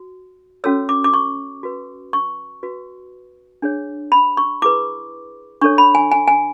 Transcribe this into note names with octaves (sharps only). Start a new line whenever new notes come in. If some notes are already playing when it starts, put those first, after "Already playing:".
Already playing: F#4
C#4 F#4 A4 C#5 E6
D6
D6
C#6
F#4 B4
C#6
F#4 B4
D4 G#4 C#5
B5
C#6
E4 G#4 B4 D6
D4 A4 C#5 C#6
B5
G#5
G#5
G#5